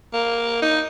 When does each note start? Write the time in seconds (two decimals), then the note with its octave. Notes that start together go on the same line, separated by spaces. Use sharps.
0.13 A#3
0.62 D#4